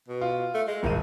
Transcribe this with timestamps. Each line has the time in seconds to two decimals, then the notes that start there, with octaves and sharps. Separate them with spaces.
0.08 B2
0.21 F4
0.54 A3
0.68 G#3
0.83 D#1 G#1 D#3 D#7